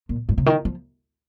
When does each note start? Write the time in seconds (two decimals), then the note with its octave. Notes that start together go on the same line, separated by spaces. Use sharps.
0.09 A#2
0.29 G2
0.38 C3
0.46 D#3
0.65 F3